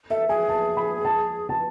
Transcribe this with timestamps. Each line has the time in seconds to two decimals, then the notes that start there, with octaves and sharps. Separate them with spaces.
0.10 A4 E5
0.29 G#4 G#5
0.49 A5
0.77 B5
1.05 A5
1.49 A5